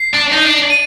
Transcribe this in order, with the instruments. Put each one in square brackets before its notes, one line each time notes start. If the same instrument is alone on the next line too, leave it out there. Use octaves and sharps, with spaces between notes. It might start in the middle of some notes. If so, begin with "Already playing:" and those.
Already playing: [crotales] C7
[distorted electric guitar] D4
D#4
D4
[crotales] D#7